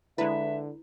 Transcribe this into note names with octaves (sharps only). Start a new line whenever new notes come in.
D3 G#3 E4 B4 E5